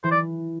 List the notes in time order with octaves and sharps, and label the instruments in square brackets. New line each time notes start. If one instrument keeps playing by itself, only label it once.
[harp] E3 [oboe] C5
[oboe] D5